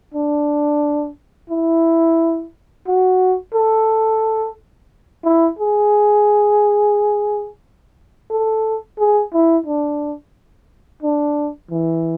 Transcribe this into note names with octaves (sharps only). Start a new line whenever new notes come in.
D4
E4
F#4
A4
E4
G#4
A4
G#4
E4
D4
D4
E3